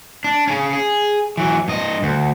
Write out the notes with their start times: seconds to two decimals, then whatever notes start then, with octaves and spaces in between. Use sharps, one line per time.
0.24 D4
0.48 C#3 C#4
0.73 G#4
1.37 E3 F#3
1.68 G2 D#5
2.03 D2